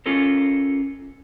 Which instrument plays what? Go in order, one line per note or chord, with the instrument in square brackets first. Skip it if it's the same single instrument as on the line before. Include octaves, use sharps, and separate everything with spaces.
[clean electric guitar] C#4 F4 A4 A#4